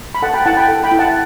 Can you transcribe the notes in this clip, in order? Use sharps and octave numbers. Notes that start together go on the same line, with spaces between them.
B5
A4 F#5 A5
G5 B5
E4 F#5 A5
G5 B5
A4
G5 B5
E4
F#5 A5